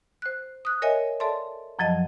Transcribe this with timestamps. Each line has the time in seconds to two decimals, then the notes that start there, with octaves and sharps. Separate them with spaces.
0.22 C5 F#6
0.65 D#6 F#6
0.82 A#4 C#5 D#5 E5 G#5
1.20 A4 D5 E5 A5 C6
1.79 F#2 F3 F#3 D#5 A5